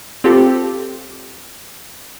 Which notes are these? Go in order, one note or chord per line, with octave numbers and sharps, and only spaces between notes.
C4 F4 G4 A4